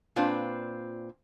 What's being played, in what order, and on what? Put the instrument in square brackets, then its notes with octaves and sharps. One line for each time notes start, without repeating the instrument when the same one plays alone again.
[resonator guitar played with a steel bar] A#2 C4 D4 F4 B4